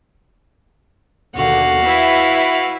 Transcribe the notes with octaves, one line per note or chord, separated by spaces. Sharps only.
D#2 B2 D3 F#4 F5
E4 B4 E5